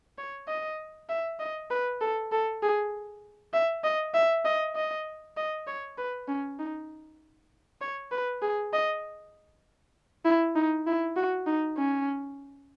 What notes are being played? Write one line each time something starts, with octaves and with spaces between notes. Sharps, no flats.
C#5
D#5
E5
D#5
B4
A4
A4
G#4
E5
D#5
E5
D#5
D#5
D#5
C#5
B4
C#4
D#4
C#5
B4
G#4
D#5
E4
D#4
E4
F#4
D#4
C#4